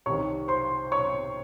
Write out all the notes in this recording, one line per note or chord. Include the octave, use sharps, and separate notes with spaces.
C2 C3 D#3 C#5 C#6
C5 C6
C#5 C#6